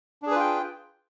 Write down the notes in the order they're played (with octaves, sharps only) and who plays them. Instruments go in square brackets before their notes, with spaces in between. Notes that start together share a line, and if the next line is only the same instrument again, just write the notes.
[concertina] D4
G#4
B4
F4
G5